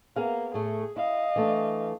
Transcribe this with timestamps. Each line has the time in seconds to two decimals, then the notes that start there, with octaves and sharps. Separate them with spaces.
0.16 A#3 B3 G#4 F5
0.54 A2 A3 G#4
0.96 E4 D#5 F5
1.36 E3 A3 D4